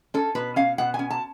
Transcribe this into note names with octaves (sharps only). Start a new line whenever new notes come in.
C#4 A4
B2 B4
C#4 F5
B2 F#5
G#5
C#4
A5